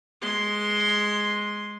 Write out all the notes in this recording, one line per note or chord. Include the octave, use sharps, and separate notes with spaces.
G#3 C6